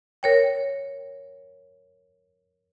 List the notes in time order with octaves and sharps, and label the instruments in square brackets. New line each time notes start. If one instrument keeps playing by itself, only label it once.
[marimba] A#4 C#5 G5